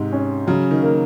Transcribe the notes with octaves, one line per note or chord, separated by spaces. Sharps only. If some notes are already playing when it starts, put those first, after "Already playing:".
Already playing: G#2 C3
C#4
C#3 F#3
D#3
A#3